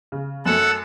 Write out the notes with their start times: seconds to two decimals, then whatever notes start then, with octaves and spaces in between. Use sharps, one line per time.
0.12 C#3
0.46 F#2 A3 A4 F#5 E6